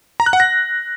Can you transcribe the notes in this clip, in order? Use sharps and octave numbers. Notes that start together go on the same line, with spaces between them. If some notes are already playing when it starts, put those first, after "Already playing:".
A#5
F#6
F#5
A#6